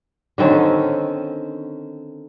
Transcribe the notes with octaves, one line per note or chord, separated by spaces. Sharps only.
D3 D#3 C4 C#4